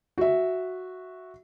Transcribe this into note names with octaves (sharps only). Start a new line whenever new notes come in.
F#4 E5